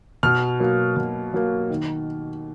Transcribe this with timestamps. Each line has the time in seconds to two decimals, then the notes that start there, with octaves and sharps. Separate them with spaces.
0.23 B2 F6
0.60 F#3 A#3
0.96 B2
1.34 F#3 A#3
1.70 D#3